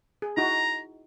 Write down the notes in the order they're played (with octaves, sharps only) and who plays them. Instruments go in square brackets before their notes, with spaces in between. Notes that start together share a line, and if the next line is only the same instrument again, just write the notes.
[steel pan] G#4
[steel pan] D#4 E4 F#4 [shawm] A#5